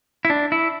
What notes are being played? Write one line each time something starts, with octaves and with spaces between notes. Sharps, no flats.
E4
D4
E4